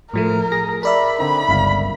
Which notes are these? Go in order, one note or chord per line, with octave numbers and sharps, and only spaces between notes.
A2 F3 A3 A#4
G#4 A#6
A#4 D5 E5 B5
D3 C4 D#4 B5
G1 C#2 F5